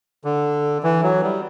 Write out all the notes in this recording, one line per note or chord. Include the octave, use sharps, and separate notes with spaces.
D3
E3
F#3
G3